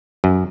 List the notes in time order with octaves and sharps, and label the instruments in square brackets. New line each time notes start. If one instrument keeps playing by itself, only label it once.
[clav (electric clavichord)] F#2